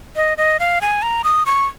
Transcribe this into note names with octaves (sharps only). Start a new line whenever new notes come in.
D#5
D#5
F5
G#5
A#5
D#6
C#6